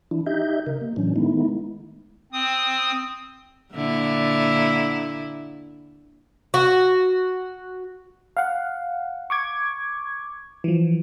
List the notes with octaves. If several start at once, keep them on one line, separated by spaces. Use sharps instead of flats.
E3 D4 E4
D#4 G4 D#5 E5 G6
C#3 A#4
A#3
A2 E3 F#3 C#4 D4
D#3 G#3 A3 B3 D#4 E4
C4 D#6
A#2 D3 E4
F#4
F5 F#5
C#6 D6 G#6
E3 F3